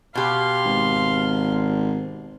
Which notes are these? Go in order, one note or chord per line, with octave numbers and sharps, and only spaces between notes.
B2 G4 F5 C6
G#1